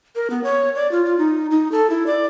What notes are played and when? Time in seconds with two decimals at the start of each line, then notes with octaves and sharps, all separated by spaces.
0.15 A#4
0.30 B3
0.44 C#5
0.76 D5
0.91 F4
1.05 F4
1.19 D#4
1.51 D#4
1.72 A4
1.90 E4
2.06 D5